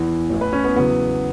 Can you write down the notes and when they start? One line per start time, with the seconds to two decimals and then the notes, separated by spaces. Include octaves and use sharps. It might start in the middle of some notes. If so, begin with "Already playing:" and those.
Already playing: E2 E3
0.30 A1 A2 E3
0.41 B4
0.53 C#4
0.64 B3
0.75 E2 C#3 F#3 B3